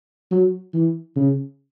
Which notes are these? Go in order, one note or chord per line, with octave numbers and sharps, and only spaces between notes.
F#3
E3
C#3